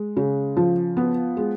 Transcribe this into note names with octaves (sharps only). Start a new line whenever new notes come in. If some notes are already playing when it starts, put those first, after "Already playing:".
Already playing: G#3
C#3
F3
B3
G#3